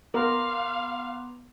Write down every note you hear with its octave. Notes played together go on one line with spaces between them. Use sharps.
B3 A#4 F5 A#5 C6 D6